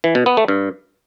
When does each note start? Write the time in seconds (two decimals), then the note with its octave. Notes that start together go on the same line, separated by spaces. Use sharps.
0.04 E3
0.15 B2
0.26 B3
0.37 A3
0.48 G2